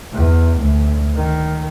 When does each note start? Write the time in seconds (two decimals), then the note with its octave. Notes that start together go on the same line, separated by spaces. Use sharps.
0.13 E2
0.59 D2
1.15 D#3